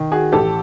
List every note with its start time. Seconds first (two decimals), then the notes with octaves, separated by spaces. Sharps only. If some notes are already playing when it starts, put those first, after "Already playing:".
Already playing: D#3
0.12 F#4 G#4
0.32 A1 G4 A4